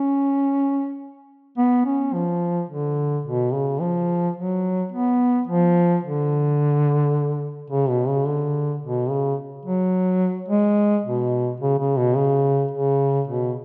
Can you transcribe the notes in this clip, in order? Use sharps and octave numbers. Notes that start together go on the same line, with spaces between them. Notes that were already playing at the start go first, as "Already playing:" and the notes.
Already playing: C#4
B3
C#4
F3
D3
B2
C#3
F3
F#3
B3
F3
D3
C#3
B2
C#3
D3
B2
C#3
F#3
G#3
B2
C#3
C#3
B2
C#3
C#3
B2